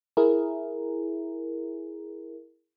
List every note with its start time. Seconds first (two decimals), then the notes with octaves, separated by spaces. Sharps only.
0.17 E4 G#4 A#4